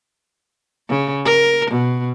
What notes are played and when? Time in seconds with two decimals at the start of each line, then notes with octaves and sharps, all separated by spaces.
0.89 C#3
1.25 A#4
1.71 B2